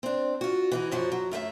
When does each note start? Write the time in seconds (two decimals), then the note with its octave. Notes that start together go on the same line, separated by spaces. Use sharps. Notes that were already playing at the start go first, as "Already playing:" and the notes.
0.03 C4 D4
0.41 F4 F#4
0.72 E3 D#4 F#4
0.91 F#2 F3 F#4
1.12 F#3
1.32 F#2 A3 A4 E5